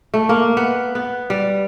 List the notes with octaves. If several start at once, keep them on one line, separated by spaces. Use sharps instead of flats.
A3
A#3
B3
B3
G3